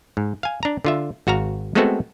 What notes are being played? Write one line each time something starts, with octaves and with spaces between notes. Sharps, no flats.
G#2
F5 G#5
D4 A#5
D3 F4 E5
G#1 F#4 F5 A#5
G#3 A3 B3 C4 F#4 A4